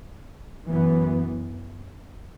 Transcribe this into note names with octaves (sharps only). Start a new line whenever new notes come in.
F#2 E3 B3